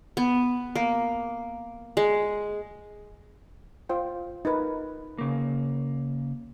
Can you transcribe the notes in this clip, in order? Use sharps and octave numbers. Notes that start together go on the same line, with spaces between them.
B3
A#3
G#3
F4 C5 G5
D#4 A#4 B4
C#3 A#3